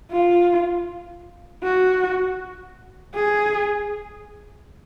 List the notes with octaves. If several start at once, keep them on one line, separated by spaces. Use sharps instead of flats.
F4
F#4
G#4